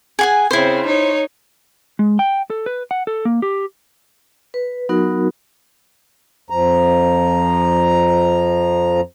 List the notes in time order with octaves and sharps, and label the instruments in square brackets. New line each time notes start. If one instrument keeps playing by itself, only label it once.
[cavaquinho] G#4 F#5 G#5
[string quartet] C#3 C4 [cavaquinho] E4 C5
[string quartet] D#4 C#5
[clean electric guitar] G#3
G5
A4
B4
F#5
A4
A#3
G4
[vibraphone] B4
F#3 B3 D#4 F#4 A#4
[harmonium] F2 F3 A#5